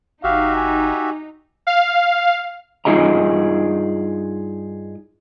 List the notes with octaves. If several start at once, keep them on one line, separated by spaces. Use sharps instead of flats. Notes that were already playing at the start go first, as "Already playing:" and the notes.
G1 D#4 F#4 G4 E5 F5
G#5
F5
G2 D#4 F4 G#4 D#5 A#5